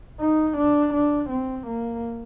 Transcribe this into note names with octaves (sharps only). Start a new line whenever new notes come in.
D#4
D4
D4
C4
A#3